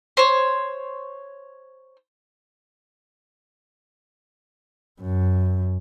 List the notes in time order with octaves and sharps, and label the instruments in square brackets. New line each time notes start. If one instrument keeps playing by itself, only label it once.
[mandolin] C5 C#5
[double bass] F#2